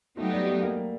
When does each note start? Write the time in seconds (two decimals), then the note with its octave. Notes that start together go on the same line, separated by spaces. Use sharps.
0.17 F#3 A3 B3 D#4 G4
0.32 G3
0.47 A3
0.61 A#3